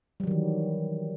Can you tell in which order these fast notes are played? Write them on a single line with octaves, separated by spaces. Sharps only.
G3 F#3 D#3 E3